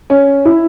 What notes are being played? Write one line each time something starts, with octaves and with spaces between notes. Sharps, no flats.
C#4
E4